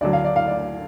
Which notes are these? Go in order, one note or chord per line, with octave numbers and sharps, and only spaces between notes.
D2 D3 F#3 D5
F5
D5
F5
D5